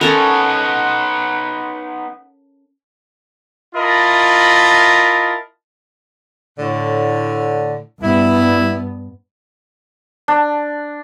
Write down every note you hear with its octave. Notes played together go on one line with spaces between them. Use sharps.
B3 C#4 D#4 A4 A#4 F#5
E4 F4 A#4 D#5 A5 B5
A2 D3
G2 G3 B3 E4
D4